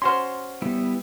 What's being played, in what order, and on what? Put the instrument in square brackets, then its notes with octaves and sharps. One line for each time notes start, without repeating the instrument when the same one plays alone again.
[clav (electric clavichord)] C#4 F#4 C5 [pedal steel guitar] C6 F6
[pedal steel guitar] G3 B3 E4